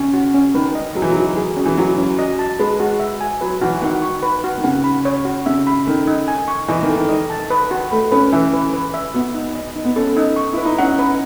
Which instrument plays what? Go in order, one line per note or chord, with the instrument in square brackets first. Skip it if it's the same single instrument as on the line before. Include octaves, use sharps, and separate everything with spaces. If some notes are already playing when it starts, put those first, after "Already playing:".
Already playing: [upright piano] C#3 [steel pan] C#4
[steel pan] F#4
C#4
[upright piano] D#3 [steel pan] B4
[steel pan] D#5
[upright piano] F#3 [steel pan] G#4
[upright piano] E3
F#3
[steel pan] D#4
G#4
C#4
[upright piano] E3
[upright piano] F#3 [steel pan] E4
[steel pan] C#4
D#5
A5
[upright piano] G#3 [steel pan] B4
[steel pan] F#4
E5
G#5
[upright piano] F#3 [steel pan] B4
[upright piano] E3 [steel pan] F#4
[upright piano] D#3 [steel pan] F#5
[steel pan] C#6
B4
F#4
[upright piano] D#3
[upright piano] C#3 [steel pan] F#5
[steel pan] B5
C#5
F#4
[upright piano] C#3 [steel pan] E5
[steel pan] B5
[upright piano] D#3 [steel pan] A4
[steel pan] D#4
G#5
C#6
[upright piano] E3 [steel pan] D#5
[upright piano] D#3
[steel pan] A4
[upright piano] D#3
[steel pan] D#5
A5
B4
F#4
[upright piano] A3 [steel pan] B5
[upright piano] C#4 [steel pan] B4
[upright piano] E3 [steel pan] E5
[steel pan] B4
B4
E5
[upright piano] B3 [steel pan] F#4
[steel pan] D#4
D#5
D#4
[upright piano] B3
[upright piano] C#4 [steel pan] A4
[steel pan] D#4
C#6
[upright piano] E4 [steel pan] B4
[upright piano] D#4
[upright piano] C#4 [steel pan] F#5
[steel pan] B4